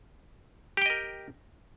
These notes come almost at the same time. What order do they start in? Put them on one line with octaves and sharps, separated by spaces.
G4 G5 D#5 A#4